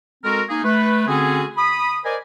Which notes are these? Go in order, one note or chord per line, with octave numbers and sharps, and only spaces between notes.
G#3 C4 F#4 A4 A#4
A#3 D#4 G#4
A3 B4
D3 C4 C#4 F#4 G#4
B5 D#6
A#4 C5 D5 D#5 G#5